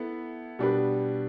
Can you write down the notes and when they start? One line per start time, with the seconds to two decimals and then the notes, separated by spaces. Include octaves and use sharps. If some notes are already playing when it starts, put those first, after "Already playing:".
Already playing: B3 E4 A4
0.59 B2 G3 D4 G4 B4